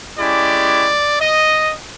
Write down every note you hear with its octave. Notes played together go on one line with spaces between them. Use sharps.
G#3 C#4 E4 G4 D5
D#5